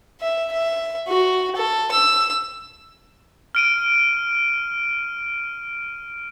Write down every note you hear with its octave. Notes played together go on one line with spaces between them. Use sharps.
E5
E5
F#4
A4
E6
F6 D7 D#7